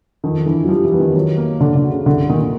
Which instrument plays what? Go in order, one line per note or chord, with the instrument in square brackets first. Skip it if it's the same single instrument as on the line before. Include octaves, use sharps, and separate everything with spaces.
[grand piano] F2 [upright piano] D#3
[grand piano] D3 [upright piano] E3
[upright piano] F#3
[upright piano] F3 [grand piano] G3
[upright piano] E3
[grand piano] B3
[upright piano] D#3
[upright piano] D#3 [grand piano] F#3
[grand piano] A#3
[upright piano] D3 [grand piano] D4
[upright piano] D3
[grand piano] F#4
[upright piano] C#3
[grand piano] C2 [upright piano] D3
[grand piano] A#2 [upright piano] D#3
[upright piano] D#3